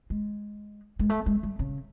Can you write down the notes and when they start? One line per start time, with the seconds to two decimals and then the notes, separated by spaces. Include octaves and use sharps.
0.10 G#3
0.99 G#3
1.09 A3
1.26 G#3
1.43 G3
1.59 C#3